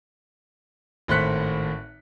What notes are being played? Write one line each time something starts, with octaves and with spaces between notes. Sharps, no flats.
G#1 A2 C5 F#6 B6 C#7